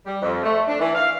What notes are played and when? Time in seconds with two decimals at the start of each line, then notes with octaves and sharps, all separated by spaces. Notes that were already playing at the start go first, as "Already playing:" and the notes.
0.05 G3
0.22 F2
0.44 A3
0.67 D4
0.80 E3
0.95 F5